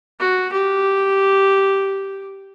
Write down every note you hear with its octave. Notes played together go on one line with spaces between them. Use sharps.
F#4
G4